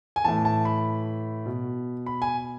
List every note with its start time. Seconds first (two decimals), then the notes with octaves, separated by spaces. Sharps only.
0.16 G#5
0.25 A2 E3 A5
0.45 A5
0.65 B5
1.46 B2
2.06 B5
2.22 G#5